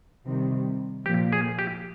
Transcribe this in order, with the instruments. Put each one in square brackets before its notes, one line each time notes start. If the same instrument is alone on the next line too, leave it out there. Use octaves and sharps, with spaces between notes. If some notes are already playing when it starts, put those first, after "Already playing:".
[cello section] C3 D#3 G3
[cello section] A#2 F3 A#3 [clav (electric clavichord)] G4
[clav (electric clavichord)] G#4
G4